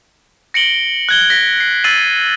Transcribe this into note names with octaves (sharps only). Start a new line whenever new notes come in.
A#6 C#7 D7 F#7 G7
F#6 G#6 G7
A#6 B6
C7
E6 A6 C7 D#7 F#7